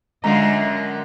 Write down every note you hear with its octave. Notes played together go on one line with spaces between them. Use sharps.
F#2 D3 G#3 F4 D#5 A#5